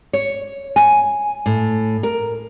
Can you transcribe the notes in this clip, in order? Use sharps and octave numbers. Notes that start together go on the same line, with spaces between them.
C#5
G#5
A2
A#4